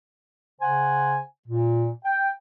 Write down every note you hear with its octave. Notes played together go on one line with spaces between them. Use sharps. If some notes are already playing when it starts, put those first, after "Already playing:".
C#3 C5 F#5 G#5
A#2
G5